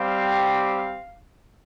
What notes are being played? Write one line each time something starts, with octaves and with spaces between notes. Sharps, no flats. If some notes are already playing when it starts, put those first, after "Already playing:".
Already playing: G3 C4 G4 F5